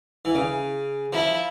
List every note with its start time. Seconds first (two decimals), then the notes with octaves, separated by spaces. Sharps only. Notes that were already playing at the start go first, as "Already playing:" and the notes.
0.25 E3
0.35 C#3
1.12 F3 E4